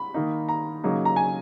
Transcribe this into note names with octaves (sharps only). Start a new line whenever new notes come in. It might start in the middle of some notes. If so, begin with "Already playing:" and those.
Already playing: B5
D#3 A#3 D#4
A#5
C#3 F#3 A#3 D#4
A#5
G#5